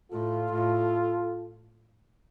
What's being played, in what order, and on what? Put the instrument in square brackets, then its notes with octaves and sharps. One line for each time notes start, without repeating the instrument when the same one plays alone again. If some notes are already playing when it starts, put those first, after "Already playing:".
[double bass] A2 [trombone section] F4 A4
[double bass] A2